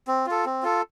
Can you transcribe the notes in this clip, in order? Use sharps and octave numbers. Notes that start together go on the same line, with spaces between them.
C4
F4 A4
C4
F4 A4